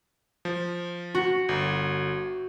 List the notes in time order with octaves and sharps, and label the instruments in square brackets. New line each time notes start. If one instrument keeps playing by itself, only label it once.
[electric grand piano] F3
[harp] F#4
[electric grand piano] G1